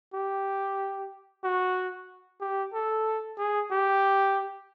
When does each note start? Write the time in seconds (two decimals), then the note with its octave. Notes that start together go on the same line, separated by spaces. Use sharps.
0.14 G4
1.44 F#4
2.41 G4
2.73 A4
3.38 G#4
3.71 G4